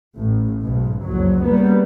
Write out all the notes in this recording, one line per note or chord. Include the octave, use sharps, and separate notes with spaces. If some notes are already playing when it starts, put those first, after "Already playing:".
A1 A2
B1 G#2 B2
F#1 C2 F2 F#3
C#3 G3 A#3 B3